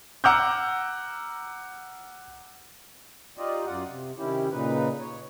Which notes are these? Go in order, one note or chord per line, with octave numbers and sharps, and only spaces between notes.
F#5 A#5 D6 E6 F6 G6
D#4 F4 G4 D5 D#5
F#2 F4 D5 F#5
C3
C3 D#3 C#4 E4 G4
A#2 C#3 D#4 B4
C#5